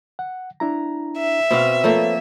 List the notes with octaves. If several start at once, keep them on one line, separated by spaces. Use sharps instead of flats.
F#5
D4 E4 A#5
E5
B2 C4 F#4 B4 C5 F5
F3 A3 A#3 A4 B4 C#5